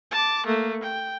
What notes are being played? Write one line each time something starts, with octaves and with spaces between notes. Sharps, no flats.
A5 D6
A3 A#3
G5